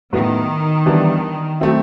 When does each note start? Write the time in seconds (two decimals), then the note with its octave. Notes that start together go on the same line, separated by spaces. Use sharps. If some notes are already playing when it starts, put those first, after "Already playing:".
0.13 A2 D#3 F#3 B3
0.86 E3 G3 B3 D4
1.60 F#3 A3 C4 E4